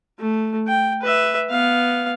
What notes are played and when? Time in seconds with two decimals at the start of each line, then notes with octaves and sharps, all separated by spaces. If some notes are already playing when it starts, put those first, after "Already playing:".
0.19 A3
0.67 G5
1.02 B4 E5
1.50 B3 F5